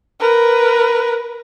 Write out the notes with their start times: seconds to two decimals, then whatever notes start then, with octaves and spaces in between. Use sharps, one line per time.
0.20 A#4 B4